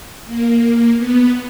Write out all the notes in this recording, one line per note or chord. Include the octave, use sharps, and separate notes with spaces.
A#3
B3